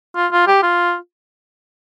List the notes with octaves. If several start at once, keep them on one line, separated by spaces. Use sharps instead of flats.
F4
F4
G4
F4